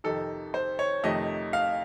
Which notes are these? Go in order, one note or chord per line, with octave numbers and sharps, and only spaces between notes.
F2 C3 D#3 A4
C5
C#5
F2 C3 D#3 A3 D#5
F5